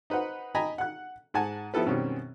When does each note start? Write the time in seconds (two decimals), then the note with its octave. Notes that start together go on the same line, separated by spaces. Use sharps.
0.10 D#4 B4 C5 F#5
0.55 D#5 G5 G#5 A#5 B5
0.78 F#5 F#6
1.34 G#2 F#5 G#5 A5
1.74 F3 B3 E4 G4 A4 B4
1.86 F#2 B2 D#3 G3 C4 C#4